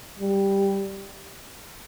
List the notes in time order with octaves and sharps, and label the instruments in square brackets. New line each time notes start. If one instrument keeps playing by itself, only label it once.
[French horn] G3